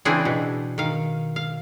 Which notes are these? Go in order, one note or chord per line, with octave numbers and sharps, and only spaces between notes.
C#3 E3 C4 D4 E4 G#4
B2
D#3 F5
F5